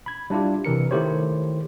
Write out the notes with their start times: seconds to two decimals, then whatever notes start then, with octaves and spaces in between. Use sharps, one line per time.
0.06 B5 G#6
0.30 G3 D4 E4 F4 G4
0.65 C3 E3 A#4 C#7
0.91 D#3 A3 E4 G4 C5 C#5